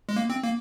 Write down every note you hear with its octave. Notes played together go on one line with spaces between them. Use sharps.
G#3
A#3
C4
A#3